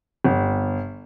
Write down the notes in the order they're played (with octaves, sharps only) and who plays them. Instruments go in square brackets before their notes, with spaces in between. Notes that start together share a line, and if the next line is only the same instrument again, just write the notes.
[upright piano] G1